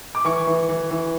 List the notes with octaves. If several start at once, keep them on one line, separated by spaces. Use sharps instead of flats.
D6
E3 C#6
E3
E3
E3